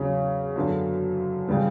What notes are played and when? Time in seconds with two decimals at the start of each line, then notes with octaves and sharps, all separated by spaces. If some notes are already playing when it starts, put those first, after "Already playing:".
Already playing: E2 C#3 F#3 C#4
0.56 F#2 D3 F#3 B3
1.48 C#3 E3 G3 B3